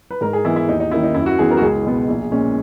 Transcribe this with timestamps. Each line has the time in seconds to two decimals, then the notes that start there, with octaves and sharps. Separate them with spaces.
0.11 B4
0.21 G#2 A#4
0.33 G#4
0.45 E3 G#3 B3 E4
0.56 E4
0.68 D#2 D#4
0.80 D#4
0.91 D#3 A#3 C#4 E4
1.03 D#4
1.14 F#2 E4
1.26 F#4
1.38 E3 B3 G#4
1.51 A#4
1.57 F#4
1.62 C#2 G#4
1.85 B2 G#3 B3
2.08 A#1
2.31 A#2 G#3 C#4